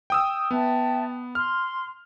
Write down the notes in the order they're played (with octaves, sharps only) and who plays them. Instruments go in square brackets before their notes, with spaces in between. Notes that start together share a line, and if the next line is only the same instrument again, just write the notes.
[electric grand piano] G5 D#6 E6
[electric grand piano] B3 [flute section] E5 G5 A5
[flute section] C6 [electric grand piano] F6